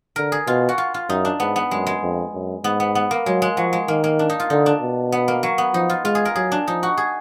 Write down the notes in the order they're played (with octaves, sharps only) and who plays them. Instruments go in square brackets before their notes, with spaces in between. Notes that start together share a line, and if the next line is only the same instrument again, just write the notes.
[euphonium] D3 [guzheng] A#4
[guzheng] G#4
[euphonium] B2 [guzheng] F4
[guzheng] F#4
F4
F4
[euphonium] F#2 [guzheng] D#4
[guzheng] D4
[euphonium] G#2 [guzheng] B3
[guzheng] B3
[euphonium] F#2 [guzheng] G#3
[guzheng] G#3
[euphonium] F2
F#2
[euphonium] G#2 [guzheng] B3
[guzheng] B3
B3
A#3
[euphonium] F#3 [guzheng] G#3
[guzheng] G#3
[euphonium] F3 [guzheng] F#3
[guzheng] G#3
[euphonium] D#3 [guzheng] A#3
[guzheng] A#3
D4
D#4
F4
[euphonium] D3 [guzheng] D#4
[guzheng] D4
[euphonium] B2
[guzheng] B3
A#3
F#3
B3
[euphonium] F3 [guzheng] D#4
[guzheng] F4
[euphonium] G#3 [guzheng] F4
[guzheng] G#4
A#4
[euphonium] F#3 [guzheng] G#4
[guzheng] D4
[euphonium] F3 [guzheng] D#4
[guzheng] F#4
G#4